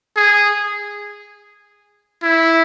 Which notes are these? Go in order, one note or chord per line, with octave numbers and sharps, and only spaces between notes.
G#4
E4